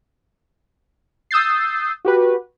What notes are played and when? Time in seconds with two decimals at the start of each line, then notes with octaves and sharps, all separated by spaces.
1.31 D#6 E6 G6 A6 C7
2.05 F#4 G4 B4